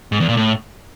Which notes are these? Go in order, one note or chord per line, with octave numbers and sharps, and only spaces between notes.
G#2
E2
A#2
A2